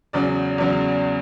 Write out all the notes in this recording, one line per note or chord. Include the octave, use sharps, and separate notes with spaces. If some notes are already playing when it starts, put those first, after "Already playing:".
E2 C#3 F#3 C#4 D5
E2 C#3 F#3 C#4